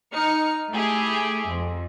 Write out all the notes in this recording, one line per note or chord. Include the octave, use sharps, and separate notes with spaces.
D#4 F6 C#7
A3 E4 G4 G#4
F2